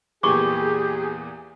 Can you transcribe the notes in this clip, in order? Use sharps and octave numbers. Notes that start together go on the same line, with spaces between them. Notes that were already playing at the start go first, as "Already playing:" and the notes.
E2 A#2 E3 G4 G#4 C#6 D6